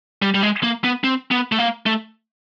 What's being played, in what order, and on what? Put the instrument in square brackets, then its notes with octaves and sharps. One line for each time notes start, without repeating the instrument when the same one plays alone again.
[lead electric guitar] G3
G3
G#3
A#3
B3
C4
B3
A3
A#3
A3